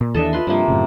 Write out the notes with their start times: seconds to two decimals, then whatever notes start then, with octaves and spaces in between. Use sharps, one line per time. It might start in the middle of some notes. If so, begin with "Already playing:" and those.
0.01 A#2
0.15 D#2 E3 D4 A4 D#5 E5
0.33 F4 B4 C6
0.47 G2 C3 F3 A#3
0.68 F#2 A2 C#3